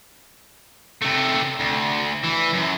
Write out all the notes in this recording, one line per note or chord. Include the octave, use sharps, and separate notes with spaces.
C3 A3
D2
E3
F#2